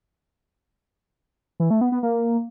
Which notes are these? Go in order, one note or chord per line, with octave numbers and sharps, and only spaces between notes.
E3
A3
B3
B3
A#3